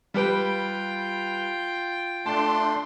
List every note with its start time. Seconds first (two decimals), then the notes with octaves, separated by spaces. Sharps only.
0.14 G3 F4 G4 B4 G5
2.26 A3 D4 A5 C6